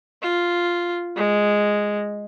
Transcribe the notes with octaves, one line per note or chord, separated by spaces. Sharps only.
F4
G#3